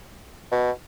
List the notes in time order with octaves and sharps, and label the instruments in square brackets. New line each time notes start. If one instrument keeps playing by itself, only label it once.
[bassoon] B2